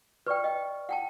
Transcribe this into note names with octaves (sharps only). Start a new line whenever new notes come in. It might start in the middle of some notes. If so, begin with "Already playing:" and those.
B4 D5 G5 C#6 F6
D#5 G5
F#5 G5 A5